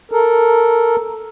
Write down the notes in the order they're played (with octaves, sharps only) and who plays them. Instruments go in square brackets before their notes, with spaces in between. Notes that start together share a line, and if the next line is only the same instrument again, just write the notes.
[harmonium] A4 A#4